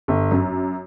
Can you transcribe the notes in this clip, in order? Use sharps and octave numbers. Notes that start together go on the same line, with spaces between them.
G1
F#2